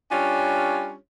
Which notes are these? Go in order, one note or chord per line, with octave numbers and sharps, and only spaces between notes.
G3 C#4 D4 F4 G4 C#5